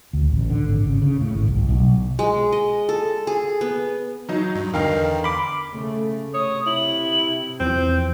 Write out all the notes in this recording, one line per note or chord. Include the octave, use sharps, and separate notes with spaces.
D2
A1
D3
G#1
C#3
C#3
A2
G#1
C2
B1
G#3
D#5
A4
G#4
B3
F#3 D#4
G2
E2 D3 D#3 F5 G5
B5 C6 D6
C#3 A3
C3 C#5 D#6
E4 F#7
E2 E3 F3 C4 G6